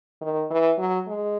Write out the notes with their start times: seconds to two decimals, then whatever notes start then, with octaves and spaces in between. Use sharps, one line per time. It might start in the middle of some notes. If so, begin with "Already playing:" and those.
0.21 D#3
0.51 E3
0.78 F#3
1.08 G#3